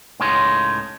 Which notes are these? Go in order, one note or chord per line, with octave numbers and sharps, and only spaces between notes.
C#2 A2 C#3 D#4 C#5 C6